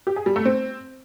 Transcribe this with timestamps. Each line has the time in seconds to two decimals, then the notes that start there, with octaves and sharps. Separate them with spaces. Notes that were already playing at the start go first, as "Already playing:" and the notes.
0.07 G4
0.16 G#4
0.26 G3
0.36 A3
0.45 C4